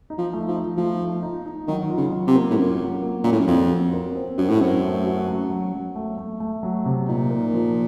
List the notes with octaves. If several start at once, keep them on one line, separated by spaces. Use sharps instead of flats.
D#4
F3
A3
F3
D#4
F3 A3
A3
D#4
D#4
D#3 F#3
F4
C#3
F#3
C3
A#3
A2
F#2 F4
F#3
A#3
A#2 C#4
A2
F#2
F2 F#4
F#4
A#4
C4
F#2 F#4
A2
F#2 C4
A3
F#4
F#3
F#3
F#3
A3
A3
A3
F#3
C3
A#2 D#4
A#4
F3